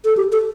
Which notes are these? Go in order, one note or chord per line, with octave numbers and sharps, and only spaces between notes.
A4
G4
A4